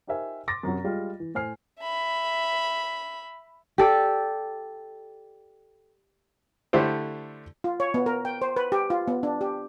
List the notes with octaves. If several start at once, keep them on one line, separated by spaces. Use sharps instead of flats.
D#4 G4 A#4 C5 E5 G#5
C6 D6 A6 A#6
F#2 C3 F#3
G3 G#3 F4
E3
A2 C5 G#5 F6 C7
E5 B5
G4 A4 D5
D3 A3 E4 G4 C5
F4
C#5
B3
A#4
G5
C5
B4
G4
F4
B3
D4
G4